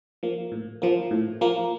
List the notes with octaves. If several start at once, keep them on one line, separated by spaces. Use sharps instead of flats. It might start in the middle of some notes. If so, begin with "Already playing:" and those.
F3 A#3
A2
F3 A#3
A2
F3 A#3